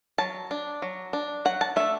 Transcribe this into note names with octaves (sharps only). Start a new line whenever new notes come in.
F#3 A5
D4
F#3
D4
F#3 F#5
A5
A3 D4 E5